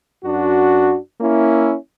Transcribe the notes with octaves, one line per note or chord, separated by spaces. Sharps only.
F#2 D4 F#4
A#3 C#4 E4